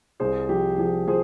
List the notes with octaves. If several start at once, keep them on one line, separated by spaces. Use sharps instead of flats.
C2 G#4 C5
F3 G4
F3 G#4
F3 G#4 C5